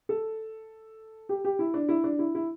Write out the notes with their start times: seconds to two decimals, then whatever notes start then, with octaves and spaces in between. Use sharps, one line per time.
0.09 A4
1.29 G4
1.45 G4
1.59 E4
1.74 D4
1.89 E4
2.04 D4
2.19 E4
2.35 E4